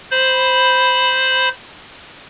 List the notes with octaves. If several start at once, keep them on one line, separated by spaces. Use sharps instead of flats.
C5 B5